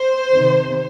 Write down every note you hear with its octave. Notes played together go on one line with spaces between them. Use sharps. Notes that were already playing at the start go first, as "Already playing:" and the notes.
Already playing: C5
C3 D#3